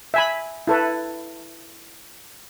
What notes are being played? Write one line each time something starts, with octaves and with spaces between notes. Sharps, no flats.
E5 G#5 B5
E4 A4 B4